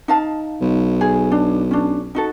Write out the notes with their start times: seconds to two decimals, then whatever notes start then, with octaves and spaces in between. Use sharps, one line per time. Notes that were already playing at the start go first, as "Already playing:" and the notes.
0.08 D#4 F5 A5
0.61 B1
1.01 G#4
1.32 D4
1.71 C#4 D4
2.15 D#4 F#4 A4